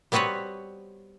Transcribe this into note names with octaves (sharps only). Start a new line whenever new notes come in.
G3 B3 C4 F#4 B4 C#5